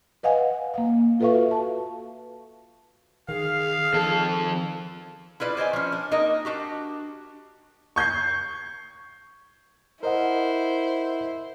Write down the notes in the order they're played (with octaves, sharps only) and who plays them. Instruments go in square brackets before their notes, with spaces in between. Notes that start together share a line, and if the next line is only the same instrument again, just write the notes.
[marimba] B4 D#5 F5 F#5 G#5
A#3 F5
F4 A4 B4 E5 F5 C#6
F#4
A5
[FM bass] D#3 [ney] G#4 [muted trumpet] F5
[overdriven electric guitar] F2 A4 [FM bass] D#3
[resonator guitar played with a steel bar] E4 F4 B4 D5
C5 D5 D#5 G#5
F3 C#4
D4
A#3 D#4 A#4 D#5
D4 F#4 G4
[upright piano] C#6 G6 G#6 C7
[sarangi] E4 [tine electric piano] A#4 D#5 F#5 [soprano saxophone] C5